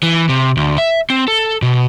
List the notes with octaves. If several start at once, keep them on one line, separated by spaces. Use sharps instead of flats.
E3
C3
D2
E5
C4
A4
B2